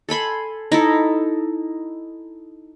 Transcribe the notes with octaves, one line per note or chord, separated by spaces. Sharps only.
A4 G#5 B5 C6
D#4 E4 A4